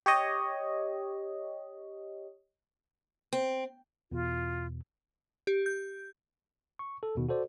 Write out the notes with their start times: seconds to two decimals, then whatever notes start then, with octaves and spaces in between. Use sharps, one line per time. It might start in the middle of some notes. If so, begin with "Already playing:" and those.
0.06 G4 C#5 D#5
3.33 C4
4.12 E2 B2 F4
5.47 G4
5.66 G6
6.79 C#6
7.03 A4
7.15 D#2 B2 D#3
7.29 F#4 A4 C5 D5